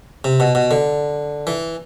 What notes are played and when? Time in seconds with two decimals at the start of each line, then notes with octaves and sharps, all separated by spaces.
0.24 C3
0.40 B2
0.55 B2
0.71 D3
1.47 E3